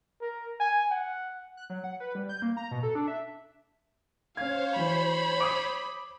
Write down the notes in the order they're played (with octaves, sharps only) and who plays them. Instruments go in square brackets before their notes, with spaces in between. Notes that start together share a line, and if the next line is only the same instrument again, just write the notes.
[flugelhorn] A#4
G#5
F#5
[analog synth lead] F#6
F#3
F#5
B4
G3
G6
A#3
A#5
B2
A4
D4
E5
[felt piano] C#4 G#6 [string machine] C5 C#5 [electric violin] F5
[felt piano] E3 F#3 [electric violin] B5
[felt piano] D6 D#6